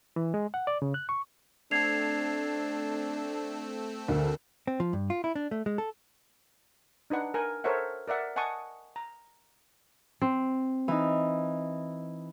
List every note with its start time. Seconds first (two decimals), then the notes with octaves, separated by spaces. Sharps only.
0.16 E3
0.34 G#3
0.54 F#5
0.67 D5
0.82 C#3
0.94 F#6
1.09 C#6
1.71 A3 C4 D4 A4 G#6 C7 F7
4.08 D2 A#4
4.67 C4
4.80 F3
4.93 G2
5.10 F4
5.24 E4
5.35 D4
5.51 A3
5.66 G#3
5.78 A4
7.10 D4 D#4 B4 F#5
7.34 A#4 G#5
7.64 A4 A#4 C5 C#5 E5 F#5
8.08 A#4 D5 E5 F#5
8.36 D#5 F#5 G#5 A5 C#6 D#6
8.96 A#5
10.21 C4
10.88 E3 D#4